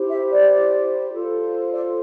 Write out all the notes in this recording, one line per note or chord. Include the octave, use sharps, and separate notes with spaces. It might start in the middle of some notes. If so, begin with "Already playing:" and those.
Already playing: E4 G4 C5
E5
D5
F4 A4 C5
D5